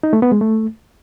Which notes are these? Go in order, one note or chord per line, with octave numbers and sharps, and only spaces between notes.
D#4
A3
B3
G#3
A3